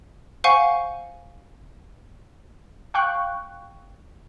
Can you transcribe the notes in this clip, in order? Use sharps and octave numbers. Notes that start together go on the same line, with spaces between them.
C5 F5 F#5 G#5 C#6
F5 G5 C#6 F#6